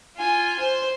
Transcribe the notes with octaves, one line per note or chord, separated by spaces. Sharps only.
F4 G#5
C5